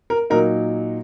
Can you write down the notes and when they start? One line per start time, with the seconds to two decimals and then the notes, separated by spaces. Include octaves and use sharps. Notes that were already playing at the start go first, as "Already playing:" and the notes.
0.10 A#4
0.30 A#2 F#3 D#4 A#4